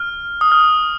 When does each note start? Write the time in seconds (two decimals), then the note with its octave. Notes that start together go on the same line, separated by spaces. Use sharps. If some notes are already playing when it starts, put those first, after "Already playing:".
Already playing: F6
0.41 D#6
0.52 F6